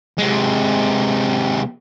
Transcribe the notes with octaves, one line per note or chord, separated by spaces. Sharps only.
C3 G#3